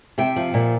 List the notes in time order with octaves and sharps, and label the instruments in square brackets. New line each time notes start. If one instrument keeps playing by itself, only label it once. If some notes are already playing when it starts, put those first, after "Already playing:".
[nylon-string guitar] C3 E5 G5
F3
A#2